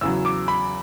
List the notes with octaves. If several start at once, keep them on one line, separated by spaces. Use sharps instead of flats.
E2 C#3 F#3 E6
D6
B5